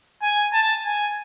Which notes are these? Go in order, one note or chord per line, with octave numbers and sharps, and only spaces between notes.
G#5
A5
G#5